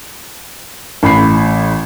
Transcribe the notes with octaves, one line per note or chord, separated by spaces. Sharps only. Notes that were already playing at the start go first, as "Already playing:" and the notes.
A1 B5 C7